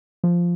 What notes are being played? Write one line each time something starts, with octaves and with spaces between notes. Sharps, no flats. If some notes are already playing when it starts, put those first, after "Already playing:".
F3